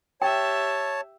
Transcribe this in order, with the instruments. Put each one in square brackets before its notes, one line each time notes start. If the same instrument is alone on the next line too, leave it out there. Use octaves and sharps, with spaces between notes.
[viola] G4 E5 [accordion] C#5 A5 [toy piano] G5